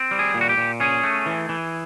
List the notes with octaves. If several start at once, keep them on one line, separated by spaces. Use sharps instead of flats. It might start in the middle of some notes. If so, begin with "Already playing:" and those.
Already playing: C4
G3
G#4
A#2
F#4
G4
A#2
C#4 G#4
A3
E3
E3